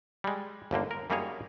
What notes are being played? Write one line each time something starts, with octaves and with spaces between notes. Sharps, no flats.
G3 G#3
G1 D#2 D3 A#3
A#4
F#2 G3 A#3 D#4 G#4 C#5